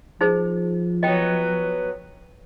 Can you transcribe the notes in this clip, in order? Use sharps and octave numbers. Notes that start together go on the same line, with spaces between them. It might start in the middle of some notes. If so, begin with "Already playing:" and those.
F3 D#4 G#4 C5
F#3 B3 D#5 G5